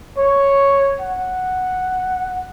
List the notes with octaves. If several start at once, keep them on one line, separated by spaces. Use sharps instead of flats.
C#5
F#5